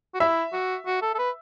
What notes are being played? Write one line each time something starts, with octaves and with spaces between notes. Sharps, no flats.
F#4
E4 E5
F#4
F#4
A4
A4
B4